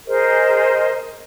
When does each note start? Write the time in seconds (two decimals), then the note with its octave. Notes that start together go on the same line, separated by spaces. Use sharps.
0.07 G#4 A#4 C5 D#5